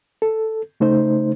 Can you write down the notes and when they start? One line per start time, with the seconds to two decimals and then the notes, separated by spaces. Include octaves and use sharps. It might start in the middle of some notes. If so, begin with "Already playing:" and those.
0.22 A4
0.80 C#3 A3 D#4 C5